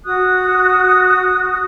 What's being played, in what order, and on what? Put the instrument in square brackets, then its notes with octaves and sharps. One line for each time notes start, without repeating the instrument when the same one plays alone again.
[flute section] F#4 D#6 F#6